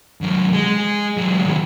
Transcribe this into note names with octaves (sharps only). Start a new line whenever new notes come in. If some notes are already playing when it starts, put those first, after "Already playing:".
D#2 F#3
G#3 G#4
F#3 G#3
A2 D#3